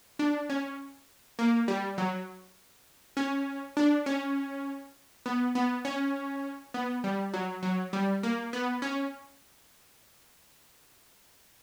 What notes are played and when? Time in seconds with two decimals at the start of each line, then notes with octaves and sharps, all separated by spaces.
0.19 D4
0.50 C#4
1.39 A#3
1.68 G3
1.98 F#3
3.17 C#4
3.77 D4
4.06 C#4
5.26 B3
5.55 B3
5.85 C#4
6.74 B3
7.04 G3
7.34 F#3
7.63 F#3
7.93 G3
8.23 A#3
8.53 B3
8.82 C#4